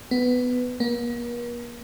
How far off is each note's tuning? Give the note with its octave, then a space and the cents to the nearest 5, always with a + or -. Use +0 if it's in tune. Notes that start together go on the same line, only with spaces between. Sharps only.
B3 +10
A#3 +45